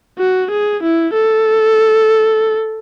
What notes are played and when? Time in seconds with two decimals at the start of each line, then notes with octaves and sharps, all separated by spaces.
0.19 F#4
0.51 G#4
0.83 E4
1.14 A4